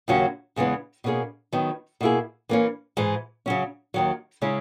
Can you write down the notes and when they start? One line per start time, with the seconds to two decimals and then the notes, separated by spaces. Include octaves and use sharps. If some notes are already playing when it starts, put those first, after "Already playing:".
0.08 D#2 C#3 F#3 C#4 F#4
0.56 E2 C#3 E3 G#3 B3
1.04 B2 A#3 C#4 G#4
1.52 D#3 F#3 B3
2.01 B2 A#3 E4 G#4
2.49 E3 A#3 C#4
2.97 G#2 E3 G#3
3.46 C#3 F#3 C#4
3.94 D#2 D#3 F#3
4.42 C#3 G#3 C#4 E4